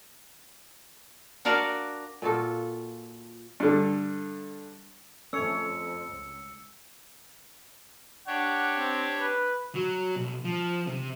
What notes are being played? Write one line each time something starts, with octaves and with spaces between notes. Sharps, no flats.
D4 F#4 A#4 D5 F5
A#2 F4 F#4 A4
G2 D3
F2 A3 C#4 C#5 E6 C#7
C#2
D4 G4 C#5 F#5
C4
B4
F#3
B1
F3
C3